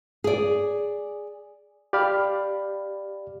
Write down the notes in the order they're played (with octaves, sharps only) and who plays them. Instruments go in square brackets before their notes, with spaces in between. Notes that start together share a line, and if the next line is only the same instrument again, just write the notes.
[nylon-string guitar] G#4 D5
[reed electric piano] G4 D5 F5 B5 F6